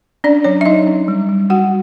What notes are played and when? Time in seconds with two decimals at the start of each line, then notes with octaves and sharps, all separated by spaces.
0.24 C#4 D4 D5
0.44 F#3 C#4 C#5
0.61 E5
0.65 F#3 D#4 D#5
0.87 C#4
1.08 G3
1.29 G3
1.50 G3 F#4 F#5